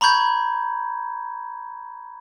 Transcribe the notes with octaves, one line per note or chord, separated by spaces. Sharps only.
A#5 B5 C#6 G6 G#6